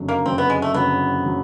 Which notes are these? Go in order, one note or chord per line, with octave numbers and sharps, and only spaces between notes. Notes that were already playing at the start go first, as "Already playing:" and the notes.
Already playing: F#1 F2 D3 F#3
A#3
F#1 F2 D3 F#3 C4
B3
G#3
A3
F#1 F2 D3 F#3 B3
D3 F#3